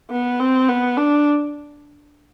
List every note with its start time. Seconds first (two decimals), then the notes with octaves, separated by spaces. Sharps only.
0.11 B3
0.40 C4
0.68 B3
0.97 D4